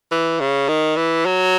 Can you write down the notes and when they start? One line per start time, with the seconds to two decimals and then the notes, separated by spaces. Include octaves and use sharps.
0.12 E3
0.40 C#3
0.68 D#3
0.96 E3
1.26 F#3